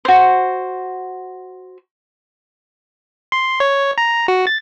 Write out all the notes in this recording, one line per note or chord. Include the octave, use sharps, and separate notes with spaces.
F#4 C5
C6
C#5
A#5
F#4
A6